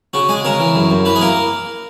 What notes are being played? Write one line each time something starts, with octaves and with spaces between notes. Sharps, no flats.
C#3 F#4
G#3 G#4
C#3 A#4
E3
F#2
F#2
E3 B4
G#4
A#3 A#4